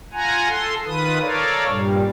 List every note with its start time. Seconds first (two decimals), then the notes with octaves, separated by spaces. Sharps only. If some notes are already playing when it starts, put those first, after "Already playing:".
0.13 F4 F#5 G#5 A#5
0.48 A4 C6
0.86 D#3 F4 B4 D#6
1.21 A4 A#4 C#5 D5 F5
1.68 G2 A#2 G3